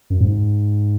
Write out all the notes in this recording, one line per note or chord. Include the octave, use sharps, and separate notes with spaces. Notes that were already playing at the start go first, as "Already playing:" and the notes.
F#2
G#2